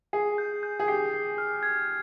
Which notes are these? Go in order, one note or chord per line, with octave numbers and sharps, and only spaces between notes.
G#4 C7
G6
G6
G#4
G4 C7
C7
F6
G#6